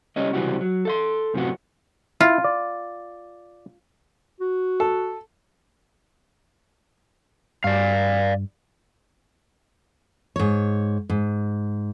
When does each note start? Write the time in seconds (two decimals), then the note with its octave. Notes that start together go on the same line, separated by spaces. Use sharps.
0.16 C2 G3 C#4 C#5 D#5
0.33 C#2 C3 E3 G3 C4 F#4
0.61 F#3
0.85 A4 E5 C6
1.34 F#2 A2 C3 F3 B3 F#4
2.21 E4 F4
2.44 D5
4.40 F#4
4.80 A4
7.64 G2 D5 F5
10.36 G#2 C#5
11.09 G#2